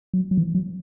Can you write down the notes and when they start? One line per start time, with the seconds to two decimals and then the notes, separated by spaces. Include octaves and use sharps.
0.14 F#3
0.31 F#3
0.37 E3
0.55 F#3